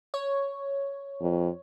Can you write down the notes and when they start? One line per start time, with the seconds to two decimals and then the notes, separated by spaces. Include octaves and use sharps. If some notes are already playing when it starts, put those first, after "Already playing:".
0.14 C#5
1.21 F2